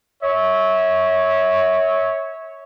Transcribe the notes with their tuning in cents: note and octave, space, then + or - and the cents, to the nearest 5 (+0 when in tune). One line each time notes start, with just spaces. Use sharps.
C#5 +0 E5 -25